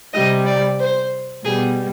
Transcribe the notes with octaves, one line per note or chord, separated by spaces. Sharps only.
C3 G3 D#5
D5
C5
B2 G3 G#4